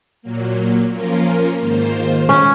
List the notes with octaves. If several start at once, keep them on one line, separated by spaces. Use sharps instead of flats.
A#2 F#3 A#3
F3 A#3 C#4 F4 A#4
G#2 D#3 A#3 F4 C5
C#4